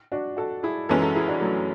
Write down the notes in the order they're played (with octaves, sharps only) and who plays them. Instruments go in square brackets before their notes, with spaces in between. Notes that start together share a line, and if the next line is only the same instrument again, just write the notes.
[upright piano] D4 F#4
F#4 A4
E4 G#4
[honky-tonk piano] F#2 E3 G#3 C#4 [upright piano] F#4 A4
[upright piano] F#4 A4
E4 G#4
D4 F#4
F#3 A3